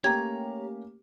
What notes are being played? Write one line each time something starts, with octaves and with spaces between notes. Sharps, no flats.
A3 A#3 C#4 G4 C#5 A#5 G#6